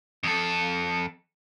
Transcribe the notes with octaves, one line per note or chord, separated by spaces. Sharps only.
F2 A4